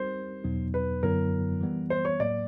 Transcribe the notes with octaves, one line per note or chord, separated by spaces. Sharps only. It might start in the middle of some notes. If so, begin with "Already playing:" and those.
Already playing: G3 C4 D#4 G4 A#4 C5
E2 B2 F#3 B3 D#4
B4
F#2 D3 F#3 B3 E4 A#4
E3 G3 B3
C5
C#5
A2 F#3 A#3 D5